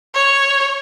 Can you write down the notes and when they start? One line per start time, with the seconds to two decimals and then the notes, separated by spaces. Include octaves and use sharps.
0.14 C#5